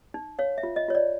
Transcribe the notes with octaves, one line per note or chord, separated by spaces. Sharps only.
D#4
C#5 F5
E5
F4
D#5
F4 C#5
D5